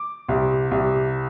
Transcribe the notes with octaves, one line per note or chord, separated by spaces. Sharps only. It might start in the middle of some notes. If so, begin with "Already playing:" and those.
Already playing: D6
C2
C2